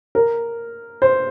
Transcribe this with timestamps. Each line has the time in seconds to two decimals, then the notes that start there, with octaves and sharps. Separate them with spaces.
0.15 A#4
1.02 C5